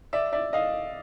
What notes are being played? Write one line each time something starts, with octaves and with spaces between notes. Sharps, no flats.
D5 E5
D5 E5
D#5 F5